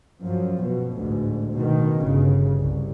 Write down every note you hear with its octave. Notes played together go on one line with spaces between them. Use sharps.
F#2 F3
B2
A1 D2 G#2
B2 D#3
G1 C#3
C2